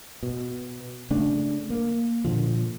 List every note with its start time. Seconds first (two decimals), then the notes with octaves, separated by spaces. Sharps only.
0.23 B2
1.10 C#3 A3 D4
1.70 A#3
2.24 A#2 D3 F3